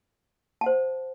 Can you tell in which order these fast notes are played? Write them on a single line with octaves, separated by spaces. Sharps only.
A5 F#5 C5